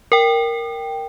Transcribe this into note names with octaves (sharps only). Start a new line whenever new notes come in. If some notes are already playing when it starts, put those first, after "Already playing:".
A#4 G5